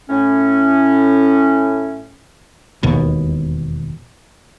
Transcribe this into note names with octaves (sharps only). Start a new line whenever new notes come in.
A2 C#4
E1 D#2 B2